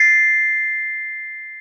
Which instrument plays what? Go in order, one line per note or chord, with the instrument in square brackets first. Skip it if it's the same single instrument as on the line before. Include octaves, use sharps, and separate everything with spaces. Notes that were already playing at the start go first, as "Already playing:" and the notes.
Already playing: [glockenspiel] A6 C7